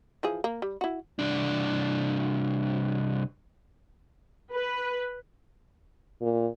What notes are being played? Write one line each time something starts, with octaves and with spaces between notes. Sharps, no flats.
E3 F3 G#4
A#3
G3
E4 F#4
C2 D4
B4
A#2